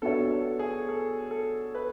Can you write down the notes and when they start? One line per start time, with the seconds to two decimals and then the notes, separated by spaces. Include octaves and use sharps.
0.02 B3 D4 F#4 A4 C#5
0.31 A4
0.59 G#4
0.89 A4
1.31 A4
1.75 B4